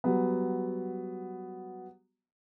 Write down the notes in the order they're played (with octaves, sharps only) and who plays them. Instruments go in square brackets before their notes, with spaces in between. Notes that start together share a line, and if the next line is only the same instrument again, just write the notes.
[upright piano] F#3 G3 B3